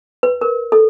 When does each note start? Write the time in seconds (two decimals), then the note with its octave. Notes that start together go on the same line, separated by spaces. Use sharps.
0.23 B4
0.41 A#4
0.72 A4